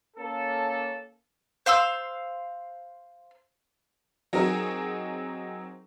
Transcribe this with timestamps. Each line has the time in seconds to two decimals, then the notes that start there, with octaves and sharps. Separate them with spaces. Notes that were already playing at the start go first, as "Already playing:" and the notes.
0.17 A#3 C#4 A4
1.66 C5 F5 C6 E6
4.33 F#3 C4 D#4 G#4 A#4